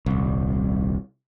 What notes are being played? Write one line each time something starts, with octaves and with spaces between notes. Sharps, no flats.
D#1 C2